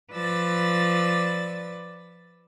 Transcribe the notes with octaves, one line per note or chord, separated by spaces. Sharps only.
F3 B4 D5 E6 A6